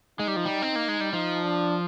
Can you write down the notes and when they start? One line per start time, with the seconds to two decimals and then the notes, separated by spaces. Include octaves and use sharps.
0.19 G#3 D#4
0.28 G3
0.36 F3
0.45 G3
0.62 C4
0.76 A#3
0.88 G#3
1.00 G3
1.13 F3 D#4
1.44 D4